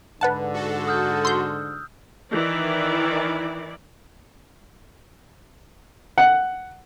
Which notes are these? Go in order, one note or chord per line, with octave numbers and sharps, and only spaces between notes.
G#2 D3 B4 F#5 A5
F#4 A4
D#6 F6 G6
C6 E6 G6
D#3 E3 E4 D5
F#5